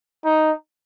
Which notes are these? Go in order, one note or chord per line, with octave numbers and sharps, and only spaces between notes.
D#4